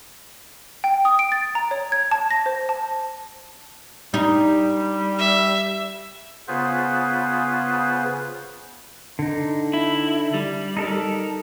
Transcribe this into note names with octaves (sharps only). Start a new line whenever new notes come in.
G5
D#6
D7
A6
A#5
C#5
G#6
A5
A#6
C5
A5
G3 D#4
E5
C#3 B3 F4 G#4 B4 C5
D3 D#4
E4
G3
D#4 A4 A#4